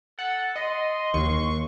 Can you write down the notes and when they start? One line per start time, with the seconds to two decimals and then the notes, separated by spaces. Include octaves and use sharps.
0.19 A4 F#5
0.56 D#5 C6
1.14 D#2 C#6